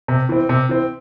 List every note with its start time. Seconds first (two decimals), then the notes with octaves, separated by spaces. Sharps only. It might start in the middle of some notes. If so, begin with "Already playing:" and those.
0.08 C3
0.29 E3 C4
0.49 C3
0.69 E3 C4